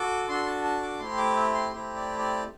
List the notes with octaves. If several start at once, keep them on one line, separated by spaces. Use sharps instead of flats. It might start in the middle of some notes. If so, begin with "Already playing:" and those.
Already playing: F#4 A4 D6
D4 F#4 A4 C6
A5
A5
D6
A3 C4 E4 G4 C6
D6
C6
A3 C4 E4 G4
D5
D5